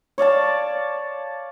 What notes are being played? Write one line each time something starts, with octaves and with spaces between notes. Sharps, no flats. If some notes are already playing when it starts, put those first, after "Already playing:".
C#5 D5 F5 A5